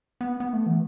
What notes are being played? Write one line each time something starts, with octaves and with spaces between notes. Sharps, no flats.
B3
B3
A3
E3